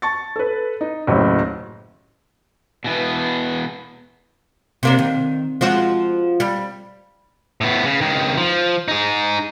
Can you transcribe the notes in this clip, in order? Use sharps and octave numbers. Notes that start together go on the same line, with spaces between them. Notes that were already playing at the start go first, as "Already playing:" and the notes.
A5 C#6 A6
A4 B4
D#4
F#1 D#2 A2 F#3
B2 E3 B3
C3 A#3 D4
D#3
F3 G#3 F#4
G3
A2 B3
C#3
C#2 D#3
F3
D#4 G#4